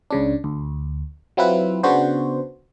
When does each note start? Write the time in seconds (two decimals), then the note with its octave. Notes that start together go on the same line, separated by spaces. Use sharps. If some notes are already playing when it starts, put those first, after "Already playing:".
0.11 C#2 C#3 D4
0.44 D2
1.37 F#3 C4 E4 F4 B4
1.83 C#3 B3 D4 F#4 C5